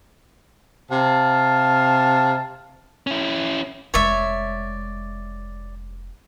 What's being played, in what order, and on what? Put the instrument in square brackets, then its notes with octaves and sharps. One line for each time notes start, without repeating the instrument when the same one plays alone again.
[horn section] C3 F5 A5
[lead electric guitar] C#4 E4
[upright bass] F1 G#3 [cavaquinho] C#5 D5 E5